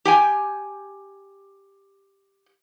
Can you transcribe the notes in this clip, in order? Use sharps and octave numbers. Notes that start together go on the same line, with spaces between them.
G4 G5 G#5